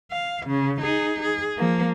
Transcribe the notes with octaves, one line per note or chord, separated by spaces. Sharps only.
F5
C#3
D#4 G#4
G#4
F3 A#3